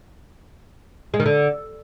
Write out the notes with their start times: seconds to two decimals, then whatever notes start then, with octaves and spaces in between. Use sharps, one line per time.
1.14 G#3
1.20 D#3
1.26 D3